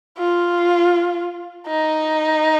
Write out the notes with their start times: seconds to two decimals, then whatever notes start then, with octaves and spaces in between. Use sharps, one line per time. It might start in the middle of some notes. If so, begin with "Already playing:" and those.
0.19 F4
1.67 D#4